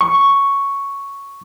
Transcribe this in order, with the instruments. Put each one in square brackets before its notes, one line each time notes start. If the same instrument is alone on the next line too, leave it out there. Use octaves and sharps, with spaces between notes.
[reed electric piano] C#6